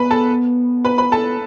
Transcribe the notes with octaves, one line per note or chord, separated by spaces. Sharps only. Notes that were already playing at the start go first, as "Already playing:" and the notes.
Already playing: B3 B4 B5
A4 A5
B4 B5
B4 B5
A4 A5